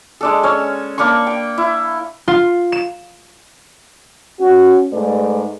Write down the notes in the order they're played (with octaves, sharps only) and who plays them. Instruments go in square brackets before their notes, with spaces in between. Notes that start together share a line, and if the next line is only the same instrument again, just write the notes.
[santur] G#3 D4 A4
C#4 C#5 E6
A#3 D4 B5 C#6
G5
E4
[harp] F4
E7
[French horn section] C#4 F#4
G#2 A3 B4 D5